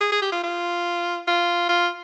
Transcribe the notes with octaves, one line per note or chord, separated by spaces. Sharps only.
G#4
G#4
G4
F4
F4
F4
F4